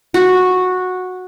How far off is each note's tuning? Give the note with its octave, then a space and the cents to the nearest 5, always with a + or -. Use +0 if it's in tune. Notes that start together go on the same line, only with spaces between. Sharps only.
F#4 -10